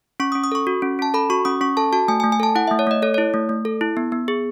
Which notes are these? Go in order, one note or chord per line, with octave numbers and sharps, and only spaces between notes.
C#4 C#6
D#6
C#4
D#6
A4 C#6
F#4
C#4
C#4 A5
A4 B5
F#4 C#6
C#4 D#6
C#4 C#6
A4 A5
F#4 A5
A3 G#5
G#5
A3
G#5
A4 A5
E4 F#5
A3 E5
C#5
A3 D#5
A4 C#5
E4 C#5
A3
A3
A4
E4
B3
B3
G#4